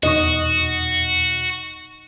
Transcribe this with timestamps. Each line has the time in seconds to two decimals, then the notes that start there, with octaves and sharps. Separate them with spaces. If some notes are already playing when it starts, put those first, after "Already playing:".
0.03 E2 B2 D#4 F#4 D#5 C#6